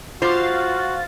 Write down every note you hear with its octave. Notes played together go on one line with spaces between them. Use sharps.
F4 F#4 C5 F5 A6